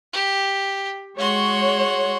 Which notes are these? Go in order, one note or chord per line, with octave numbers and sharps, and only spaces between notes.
G4
G#3 F#4 C#5 C6